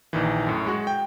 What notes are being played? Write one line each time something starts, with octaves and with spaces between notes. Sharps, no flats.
A#1 D#3 E3
F#2 A2
G#3 F#4
G5